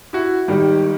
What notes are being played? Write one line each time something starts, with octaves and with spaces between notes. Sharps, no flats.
E4 F#4
G#1 D#3 G3